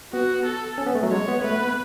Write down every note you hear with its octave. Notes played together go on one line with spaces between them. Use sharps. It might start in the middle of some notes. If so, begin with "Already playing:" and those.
B3 F#4
A4
C#4
B3
A3
F#3
G#3 C#5
B3
A3 B4
B3